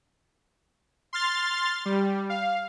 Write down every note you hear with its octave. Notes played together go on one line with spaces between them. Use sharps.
C6 F6 A6
G3
F5